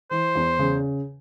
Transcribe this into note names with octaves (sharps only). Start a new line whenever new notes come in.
E3 C5
E2
C#3